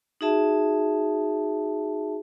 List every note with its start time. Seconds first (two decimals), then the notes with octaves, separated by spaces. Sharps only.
0.21 D#4 F#4 G#4 E5 A5